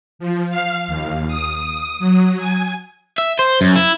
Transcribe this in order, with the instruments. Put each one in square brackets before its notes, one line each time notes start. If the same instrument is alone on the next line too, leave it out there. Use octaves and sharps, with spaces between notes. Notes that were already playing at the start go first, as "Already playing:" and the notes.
[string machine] F3
F5
D#2
D#6
D#6
F#3
G#5
[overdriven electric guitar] E5
C5
F#2
E4